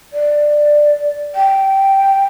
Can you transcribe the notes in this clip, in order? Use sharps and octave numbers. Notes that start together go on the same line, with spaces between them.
D5
G5